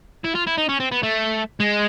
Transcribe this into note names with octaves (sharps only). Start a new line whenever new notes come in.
E4
F4
E4
D#4
C#4
C4
B3
A3
G#3